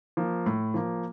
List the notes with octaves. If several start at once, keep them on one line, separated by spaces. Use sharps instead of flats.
F3 A#3
A2
F3 A#3